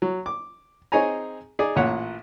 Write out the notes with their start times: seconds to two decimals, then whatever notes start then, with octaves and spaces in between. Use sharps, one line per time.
0.02 F#3
0.26 D6
0.92 C4 D#4 G#4 C#5 G#5 A#5
1.59 D#4 G#4 D5
1.76 A1 A#2 C#5 F#5